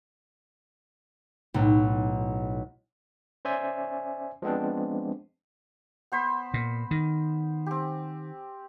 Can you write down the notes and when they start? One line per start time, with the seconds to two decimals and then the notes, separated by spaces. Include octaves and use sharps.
1.54 B1 A2
3.45 C#4 C5 D5 E5 G#5
4.42 F3 G#3 B3 C4 D4
6.12 B3 C5 B5
6.54 A#2
6.91 D#3
7.66 C4 G4